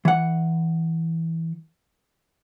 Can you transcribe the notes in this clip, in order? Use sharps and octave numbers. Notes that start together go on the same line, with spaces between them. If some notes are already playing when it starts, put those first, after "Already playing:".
E3 F#5